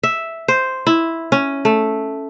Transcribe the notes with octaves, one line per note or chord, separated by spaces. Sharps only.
E5
C5
E4
C#4
A3